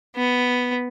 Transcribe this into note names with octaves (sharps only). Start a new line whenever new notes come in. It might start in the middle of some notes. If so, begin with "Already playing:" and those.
B3